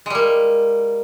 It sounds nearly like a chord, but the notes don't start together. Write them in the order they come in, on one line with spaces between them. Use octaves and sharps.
G#3 G3 A#3